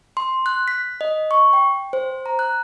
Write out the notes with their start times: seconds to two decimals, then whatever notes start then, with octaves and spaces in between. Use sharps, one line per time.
0.17 C6
0.46 F#6
0.68 B6
1.01 D#5
1.31 C#6
1.53 G5
1.93 C5
2.26 A#5
2.39 F#6